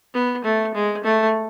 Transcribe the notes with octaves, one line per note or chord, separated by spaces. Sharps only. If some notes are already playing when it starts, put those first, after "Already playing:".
B3
A3
G#3
A3